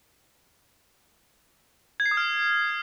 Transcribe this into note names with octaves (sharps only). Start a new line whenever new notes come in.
G#6
C7
D#6
F6